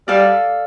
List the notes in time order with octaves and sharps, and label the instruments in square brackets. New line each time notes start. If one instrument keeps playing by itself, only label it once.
[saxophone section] G3 [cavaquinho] A4 D5 F5